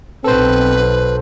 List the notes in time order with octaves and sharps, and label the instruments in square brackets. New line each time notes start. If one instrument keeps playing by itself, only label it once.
[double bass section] B1 B2 [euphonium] C4 [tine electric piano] A4 C5 [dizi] B4